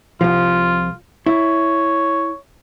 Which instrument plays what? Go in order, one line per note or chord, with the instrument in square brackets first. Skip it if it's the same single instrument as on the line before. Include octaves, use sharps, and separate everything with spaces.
[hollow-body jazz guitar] C2 F3 [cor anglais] F4
[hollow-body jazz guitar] E4 [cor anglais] C#5